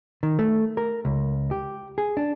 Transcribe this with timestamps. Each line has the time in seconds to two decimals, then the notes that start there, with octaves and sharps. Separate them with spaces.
0.23 D#3
0.39 A3
0.77 A#4
1.05 C#2
1.51 G4
1.98 G#4
2.17 D4